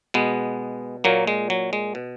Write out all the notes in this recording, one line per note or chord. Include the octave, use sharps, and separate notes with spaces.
B2 G#3 B3
A#2 F#3 A#3
G#3
F#3
G#3
B2